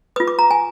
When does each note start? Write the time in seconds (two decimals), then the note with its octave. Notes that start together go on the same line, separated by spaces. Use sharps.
0.16 F4 B4 D#6
0.27 D6
0.39 A#5
0.51 G#5